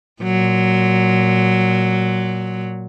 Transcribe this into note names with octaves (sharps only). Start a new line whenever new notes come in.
A#2 F#3